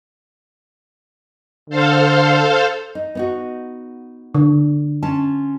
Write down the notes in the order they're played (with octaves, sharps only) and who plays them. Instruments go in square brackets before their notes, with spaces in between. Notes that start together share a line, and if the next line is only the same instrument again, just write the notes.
[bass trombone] D3 [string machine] A4 C5 F5
[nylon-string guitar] D#4
B3 D#4 F#4
[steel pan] D3
[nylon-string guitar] C#4 F4 A5